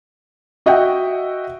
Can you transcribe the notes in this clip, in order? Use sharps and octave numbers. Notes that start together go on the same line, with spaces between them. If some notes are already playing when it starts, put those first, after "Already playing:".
F#4 D#5 E5 F#5 G5